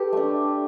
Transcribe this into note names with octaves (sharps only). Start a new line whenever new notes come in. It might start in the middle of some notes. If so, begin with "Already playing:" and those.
Already playing: G4 A4 B4
A3 D4